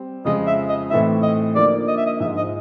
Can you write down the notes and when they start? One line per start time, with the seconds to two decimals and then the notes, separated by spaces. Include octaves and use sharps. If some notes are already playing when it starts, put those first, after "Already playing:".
Already playing: G3 C4
0.25 F2 C#3 F3 G#3 D#5
0.47 E5
0.69 D#5
0.90 A2 E3 A3 C4 D#4 E5
1.22 D#5
1.55 D3 F3 A#3 D#4 D5
1.88 D#5
1.97 E5
2.06 D#5
2.20 G#2 F3 G#3 E5
2.37 D#5